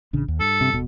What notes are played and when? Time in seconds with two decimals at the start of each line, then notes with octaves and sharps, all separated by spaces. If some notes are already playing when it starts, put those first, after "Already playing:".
0.13 A1 C#3 D4
0.28 D#2
0.40 G2 A4
0.61 C3
0.74 D#1 B2